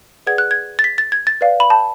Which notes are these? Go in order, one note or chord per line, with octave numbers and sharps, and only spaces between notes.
G#4 B4 D5 F#5 G#6
F#6
G#6
A6
B6
A6
G#6
A6
B4 D5 F5
B5
A5